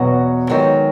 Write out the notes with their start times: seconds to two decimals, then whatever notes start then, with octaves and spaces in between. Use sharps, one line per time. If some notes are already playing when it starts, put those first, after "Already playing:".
Already playing: E2 B2 F#3 B3
0.50 G#2 D#3 F#3